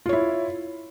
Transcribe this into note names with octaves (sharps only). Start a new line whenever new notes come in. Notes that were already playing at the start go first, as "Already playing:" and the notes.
E4 F4 C#5